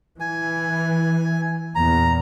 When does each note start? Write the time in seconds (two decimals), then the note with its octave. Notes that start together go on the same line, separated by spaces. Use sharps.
0.20 E3 G#5
1.75 E2 A#2 A#5